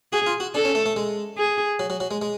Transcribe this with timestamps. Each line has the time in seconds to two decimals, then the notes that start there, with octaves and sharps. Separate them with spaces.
0.13 F#4 G#4
0.26 F4
0.40 F#4
0.55 D4 A4
0.65 C#4
0.75 A3
0.86 A3
0.96 G#3
1.38 G#4
1.80 F#3
1.90 F#3
2.00 F#3
2.11 G#3
2.22 G#3